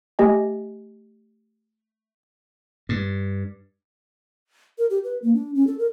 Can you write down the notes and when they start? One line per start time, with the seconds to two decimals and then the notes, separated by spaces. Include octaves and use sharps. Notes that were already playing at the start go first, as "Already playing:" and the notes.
0.19 A3 G4 D#5 G#5
2.89 G2
4.78 A#4
4.90 G4
5.04 B4
5.22 A#3
5.35 D4
5.55 C#4
5.67 A4
5.79 A#4